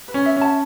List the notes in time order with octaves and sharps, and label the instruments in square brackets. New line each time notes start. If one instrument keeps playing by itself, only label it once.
[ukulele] B4
[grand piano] C#4
[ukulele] E5
[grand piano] C#4 [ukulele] A5